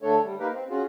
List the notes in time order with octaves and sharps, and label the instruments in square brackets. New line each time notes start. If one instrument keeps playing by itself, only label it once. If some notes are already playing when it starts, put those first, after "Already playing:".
[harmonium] D3 A3 D4 A4 C#5
G3
A#3 D#4 G4 A#4 B4
C4
C#4 F4 F#4 G#4